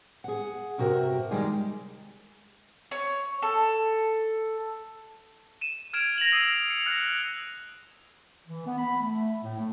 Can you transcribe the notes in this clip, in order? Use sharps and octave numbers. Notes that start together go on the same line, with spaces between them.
G#4 F#5
G2 C3 F#4 A#4 E5
D#3 G3 G#3 G4 G#4
C#5
A4
D#7 E7
F6 G#6 D7 E7 F7
A#6 F7 F#7
D#6 E6 C7 D#7 F7 F#7
C#7 F7
F6 F#6 A#6 C#7
E3
B3
B5
A3
A2
A3